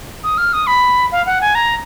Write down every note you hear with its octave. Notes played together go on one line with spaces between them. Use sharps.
D#6
F6
D#6
B5
F5
F#5
G#5
A#5